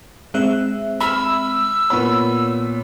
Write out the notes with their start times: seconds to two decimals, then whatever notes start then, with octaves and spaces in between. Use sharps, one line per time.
0.34 G#3 C4 E5 F#6
1.01 B5 E6 F6
1.90 A#2 B3 C#5 B5